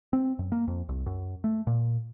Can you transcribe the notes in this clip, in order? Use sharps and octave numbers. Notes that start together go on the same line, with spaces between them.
C4
F#2
A#3
F2
C2
F#2
A3
A#2